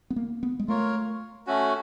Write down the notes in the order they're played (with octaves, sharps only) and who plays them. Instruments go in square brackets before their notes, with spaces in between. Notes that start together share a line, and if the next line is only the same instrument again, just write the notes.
[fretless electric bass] B3
A#3
B3
G#3
[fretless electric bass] A3 [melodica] F4 A#4 C#5
[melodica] A3 C#4 F#4